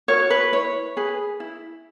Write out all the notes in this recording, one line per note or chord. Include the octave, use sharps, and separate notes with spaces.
F#4 A#4 C#5
B4
E4 C#5
G#4 B4
E4